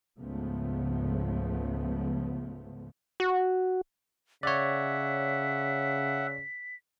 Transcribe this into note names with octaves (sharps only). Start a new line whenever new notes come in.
C#2 G#2 C#3 F3 A3 B3
F#4
C#3 C#5 D5 E5 F#5 B6